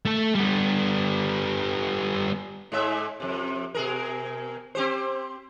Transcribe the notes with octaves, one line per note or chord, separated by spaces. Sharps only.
A3 A4
G3 B3
G#2 G#3 E5
F2 C3
B2 G#4 A#4
C4 G4 C5